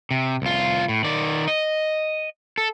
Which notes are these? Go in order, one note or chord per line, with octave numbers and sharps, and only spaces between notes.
C3
C2 F4
A2
D#3 D5
D#5
A4